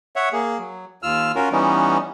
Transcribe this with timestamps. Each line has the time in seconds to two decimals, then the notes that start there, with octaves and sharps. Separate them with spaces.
0.16 C#5 E5 F#5
0.33 A#3 G#4
0.58 F#3
1.03 D#2 F4 E6 F6
1.35 C#4 F4 F#4 A#4
1.52 E3 G3 B3 C#4 D#4